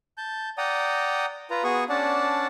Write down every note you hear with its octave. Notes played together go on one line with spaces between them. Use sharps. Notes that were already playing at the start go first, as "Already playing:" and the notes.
A5 G6
D5 F#5 G5 A#5 D#6
F4 B4 A#5
B3 F#4 G#4 C#6 D#6
C#4 D4 D5 F#5 A5